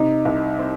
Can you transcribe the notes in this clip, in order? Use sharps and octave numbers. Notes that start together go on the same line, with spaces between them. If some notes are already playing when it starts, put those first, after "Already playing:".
Already playing: C3 D#4
C2
C4